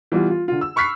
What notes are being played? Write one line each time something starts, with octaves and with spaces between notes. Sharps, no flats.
E3 G3 B3 F4
F4
D3 F4
E6
B5 C#6 F6 F#6 B6 C7